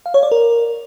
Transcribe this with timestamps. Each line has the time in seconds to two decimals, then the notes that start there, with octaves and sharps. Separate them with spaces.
0.06 F5
0.14 C#5
0.23 D5
0.32 A#4